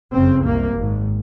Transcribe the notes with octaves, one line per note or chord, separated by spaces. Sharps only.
F#1 F2 C#3 C4
C2 C3 A#3
G#1 G#2